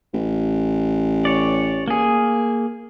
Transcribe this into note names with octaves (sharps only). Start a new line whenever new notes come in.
A1
C#5 D5
A#3 G#4